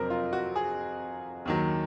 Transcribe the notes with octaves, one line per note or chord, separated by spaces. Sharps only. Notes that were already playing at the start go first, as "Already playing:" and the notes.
Already playing: F2 C3 F#3 C4 A#4
F4
F#4
G#4
D#2 D#3 F#3